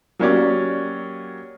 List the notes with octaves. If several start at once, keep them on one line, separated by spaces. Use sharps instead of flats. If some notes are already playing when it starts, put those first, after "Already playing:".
F#3 A#3 C#4 G4 C#5 D5